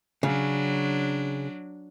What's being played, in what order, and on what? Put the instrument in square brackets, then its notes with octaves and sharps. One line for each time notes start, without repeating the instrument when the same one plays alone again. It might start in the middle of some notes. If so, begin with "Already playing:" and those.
[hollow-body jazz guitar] C#3 [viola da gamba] F#3 D4